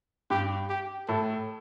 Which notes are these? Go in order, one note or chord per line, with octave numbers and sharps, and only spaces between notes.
G2 G4
G4
A2 A4